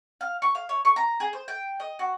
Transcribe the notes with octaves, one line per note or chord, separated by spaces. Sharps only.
F5
C#6
F5
C#5
C#6
A#5
G#4
C5
G5
D#5
F#4